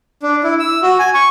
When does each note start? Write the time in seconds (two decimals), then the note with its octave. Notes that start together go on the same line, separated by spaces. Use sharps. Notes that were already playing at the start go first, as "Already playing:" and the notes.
0.23 D4
0.44 E4
0.60 E6
0.83 F#4
0.99 G#5
1.14 C#6